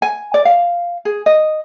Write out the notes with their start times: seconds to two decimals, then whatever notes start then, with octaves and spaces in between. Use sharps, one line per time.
0.02 G#5
0.34 D5
0.45 F5
1.05 G#4
1.26 D#5